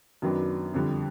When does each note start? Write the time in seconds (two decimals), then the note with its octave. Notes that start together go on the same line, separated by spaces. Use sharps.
0.22 F#2 D#3 F#3 B3 D4
0.74 F2 D3 G3